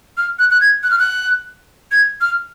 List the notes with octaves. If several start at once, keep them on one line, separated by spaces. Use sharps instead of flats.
F6
F#6
F#6
G#6
F#6
F6
F#6
G#6
F6